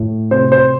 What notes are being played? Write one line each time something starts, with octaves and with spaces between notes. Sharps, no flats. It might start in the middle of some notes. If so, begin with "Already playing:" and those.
Already playing: A2
C3 C5
C5